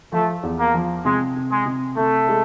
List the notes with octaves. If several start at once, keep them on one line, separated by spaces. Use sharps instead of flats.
F3 A3
E2
A#3
F3
C3 G#3
C3
G#3
C3
C3 A3
G#3